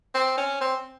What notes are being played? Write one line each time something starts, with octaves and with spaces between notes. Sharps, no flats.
C4
C#4
C4